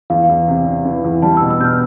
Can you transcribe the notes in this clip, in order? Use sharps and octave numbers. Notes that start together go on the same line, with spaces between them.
E2 F5
E2
C3
C3
E3
E2
G3 A5
B2 E6
E6
B2 F6 G6